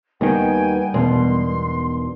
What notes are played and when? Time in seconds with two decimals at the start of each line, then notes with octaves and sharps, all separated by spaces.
0.21 D#2 D#3 G3 B3 D#4 F#4 G5 G#5
0.94 E1 G2 B2 D#3 C6